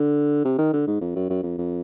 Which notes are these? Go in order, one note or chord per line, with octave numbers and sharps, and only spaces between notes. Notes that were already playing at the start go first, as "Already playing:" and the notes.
Already playing: D3
C3
D#3
D3
G#2
F2
F#2
F#2
F2
F2